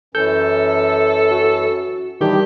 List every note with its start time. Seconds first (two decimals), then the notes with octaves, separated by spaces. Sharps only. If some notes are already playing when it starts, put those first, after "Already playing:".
0.15 F#2 E3 C#4 A4 G6
1.31 F#4
2.21 D#3 E3 G3 D4 E4 G4